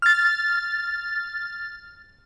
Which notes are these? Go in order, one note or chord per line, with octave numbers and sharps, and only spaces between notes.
F6 A6